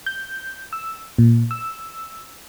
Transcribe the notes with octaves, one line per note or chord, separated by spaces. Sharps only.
G6
E6
A#2
E6